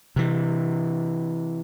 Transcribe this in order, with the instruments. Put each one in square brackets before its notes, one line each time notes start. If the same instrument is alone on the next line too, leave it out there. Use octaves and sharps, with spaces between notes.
[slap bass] C3 E3